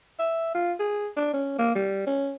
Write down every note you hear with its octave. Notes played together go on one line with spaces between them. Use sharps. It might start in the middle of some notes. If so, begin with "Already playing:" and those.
E5
F4
G#4
D4
C#4
A#3
G3
C#4